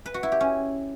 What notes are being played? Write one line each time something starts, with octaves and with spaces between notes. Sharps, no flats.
B4
F#4
E4
G4
C#4